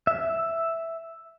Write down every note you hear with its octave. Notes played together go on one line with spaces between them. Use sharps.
E5